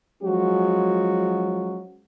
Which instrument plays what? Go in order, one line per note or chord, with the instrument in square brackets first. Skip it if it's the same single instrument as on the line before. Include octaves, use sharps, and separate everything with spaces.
[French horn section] F3 F#3 G#3 C#4 F#4